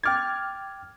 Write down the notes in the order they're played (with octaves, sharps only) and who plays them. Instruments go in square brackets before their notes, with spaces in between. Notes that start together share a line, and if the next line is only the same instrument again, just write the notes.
[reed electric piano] G5 D6 A6 [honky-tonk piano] F6 G#6